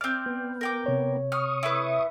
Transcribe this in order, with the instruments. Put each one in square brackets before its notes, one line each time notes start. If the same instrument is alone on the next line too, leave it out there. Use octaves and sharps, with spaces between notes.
[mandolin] C4 D5 [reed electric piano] F6 G6
[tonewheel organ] B3
[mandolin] A#4 G5 D6
[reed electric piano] C3 C#5
[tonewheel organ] C#6 D#6 [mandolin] F6
[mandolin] E4 B4